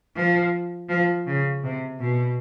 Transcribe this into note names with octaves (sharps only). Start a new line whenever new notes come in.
F3
F3
C#3
C3
B2